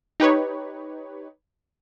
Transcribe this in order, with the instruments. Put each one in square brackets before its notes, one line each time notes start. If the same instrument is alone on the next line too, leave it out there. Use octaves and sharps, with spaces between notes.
[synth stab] D#4 G4 B4 C#5